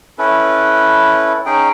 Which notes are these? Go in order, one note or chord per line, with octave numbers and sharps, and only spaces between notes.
C#4 E4 A4 B4
C#4 D#4 G#4 G5